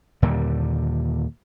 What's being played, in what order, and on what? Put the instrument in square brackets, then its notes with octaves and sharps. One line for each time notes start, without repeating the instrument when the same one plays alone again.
[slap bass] D#2 A#2 D3 G3